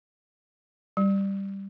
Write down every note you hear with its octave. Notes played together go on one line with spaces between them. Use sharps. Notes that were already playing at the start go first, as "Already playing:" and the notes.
G3